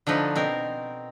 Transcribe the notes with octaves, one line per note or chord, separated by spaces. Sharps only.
D3 F3 A3 D#4 B4
B2 C4 A#4